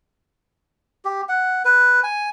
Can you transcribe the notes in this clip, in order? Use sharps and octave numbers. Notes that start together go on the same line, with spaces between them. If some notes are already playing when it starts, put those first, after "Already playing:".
G4
F#5
B4
G#5